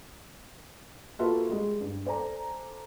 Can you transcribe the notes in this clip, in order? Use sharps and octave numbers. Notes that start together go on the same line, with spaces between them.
A#3 F4 F#4 A4 B4 E5
G3 G#3
G2
A4 C5 D5 G#5 A#5